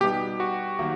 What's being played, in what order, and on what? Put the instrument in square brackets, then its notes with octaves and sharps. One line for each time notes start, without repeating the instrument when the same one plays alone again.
[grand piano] B2 G3 B3 D#4 [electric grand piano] G4
[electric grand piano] F#4
[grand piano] D#3 F#3 A#3